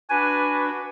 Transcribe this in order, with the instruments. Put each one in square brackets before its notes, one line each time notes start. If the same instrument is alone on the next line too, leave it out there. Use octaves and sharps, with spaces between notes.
[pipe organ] D4 F#4 B4 [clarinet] G#5